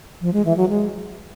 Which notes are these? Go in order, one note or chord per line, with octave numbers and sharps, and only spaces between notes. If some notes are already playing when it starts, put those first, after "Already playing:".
F3
G#3
E3
F#3
G#3